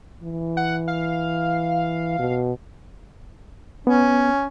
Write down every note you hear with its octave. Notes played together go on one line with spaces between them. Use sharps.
E3
F#5
F5
B2
B3 C#4